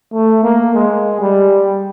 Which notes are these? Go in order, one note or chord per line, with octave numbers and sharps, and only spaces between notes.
A3
A#3
G#3
G3